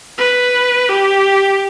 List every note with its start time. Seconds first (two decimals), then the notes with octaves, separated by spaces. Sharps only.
0.18 B4
0.90 G4